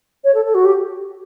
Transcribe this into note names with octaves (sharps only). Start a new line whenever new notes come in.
C#5
A4
A4
F#4
G4